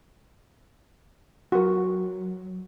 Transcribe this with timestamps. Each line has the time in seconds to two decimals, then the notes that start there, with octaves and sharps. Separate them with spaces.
1.52 F#3 F#4 A#4